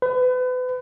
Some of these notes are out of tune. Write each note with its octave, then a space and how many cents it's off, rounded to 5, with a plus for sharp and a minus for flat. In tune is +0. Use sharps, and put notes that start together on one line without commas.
B4 +35